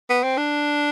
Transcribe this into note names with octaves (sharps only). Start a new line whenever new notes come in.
B3
C4
D4